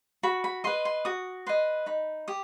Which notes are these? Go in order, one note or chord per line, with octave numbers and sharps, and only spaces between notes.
F#4 B5
B5
B4 D#5 C6
C6
F#4 D#6
B4 D#5 C6
D#4 B5
G4 D#6